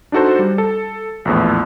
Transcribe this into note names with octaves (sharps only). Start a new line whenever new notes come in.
D4 D#4 F#4 A4 C5
G3
A4
A#1 E2 A2